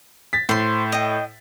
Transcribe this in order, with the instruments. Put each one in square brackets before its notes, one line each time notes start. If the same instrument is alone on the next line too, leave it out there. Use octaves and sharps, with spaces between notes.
[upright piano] A6 B6
[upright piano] A2 [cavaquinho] C5 C6
[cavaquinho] D#5 G5